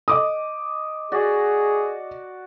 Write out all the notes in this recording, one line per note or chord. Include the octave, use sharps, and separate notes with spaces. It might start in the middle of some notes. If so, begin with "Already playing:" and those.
D#5 D6 D#6
F#4 G#4 D5